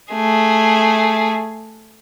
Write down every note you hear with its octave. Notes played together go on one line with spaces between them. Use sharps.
A3 G#4